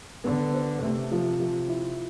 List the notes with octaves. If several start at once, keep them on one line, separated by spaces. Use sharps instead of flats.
D3 B3
C5
C3 A3
F3
F3
E4